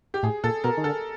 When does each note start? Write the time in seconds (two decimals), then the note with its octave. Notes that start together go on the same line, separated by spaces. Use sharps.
0.14 G4
0.23 A2 G#4
0.44 A#2 A4
0.64 B2 A#4
0.77 D#3
0.84 D3 A4